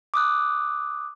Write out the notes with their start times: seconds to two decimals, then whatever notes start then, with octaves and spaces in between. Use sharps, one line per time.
0.14 D6 D#6 F#6